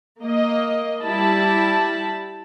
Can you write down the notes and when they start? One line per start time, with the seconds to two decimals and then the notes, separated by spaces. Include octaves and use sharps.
0.23 A#3 D#5
1.02 G3 E4 A5 B5